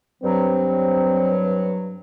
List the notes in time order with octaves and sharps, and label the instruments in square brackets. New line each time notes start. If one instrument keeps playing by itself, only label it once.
[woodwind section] G2 F#3 [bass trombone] C4